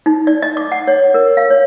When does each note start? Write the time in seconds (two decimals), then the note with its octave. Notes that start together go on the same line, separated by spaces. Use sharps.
0.06 D#4
0.27 D5
0.42 D#5
0.57 D6
0.72 F#5
0.87 C#5
1.14 A#4
1.37 F5
1.50 C#5